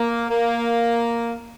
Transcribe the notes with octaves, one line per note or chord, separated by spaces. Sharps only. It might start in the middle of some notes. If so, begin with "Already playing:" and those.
Already playing: A#3
A#3